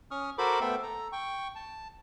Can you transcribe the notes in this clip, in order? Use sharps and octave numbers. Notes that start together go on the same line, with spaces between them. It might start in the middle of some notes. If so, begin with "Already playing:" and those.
C#4 C#6 D#6 F6
F#4 A4 A#4 C5 B5 D6
A3 B3 A4 C5 E5 G5
A4 A#5
G5 C#6
A5